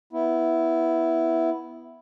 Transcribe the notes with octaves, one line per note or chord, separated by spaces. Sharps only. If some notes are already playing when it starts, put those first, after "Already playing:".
B3 E4